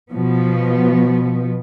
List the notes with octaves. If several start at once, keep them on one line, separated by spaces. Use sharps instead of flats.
B2 F3 B3